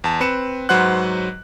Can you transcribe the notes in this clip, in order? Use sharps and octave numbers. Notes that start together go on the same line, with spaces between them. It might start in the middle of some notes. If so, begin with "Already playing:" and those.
E2 A5
C4 B4 C#7 E7
G#2 F#3 B4 C5 F#5 F#6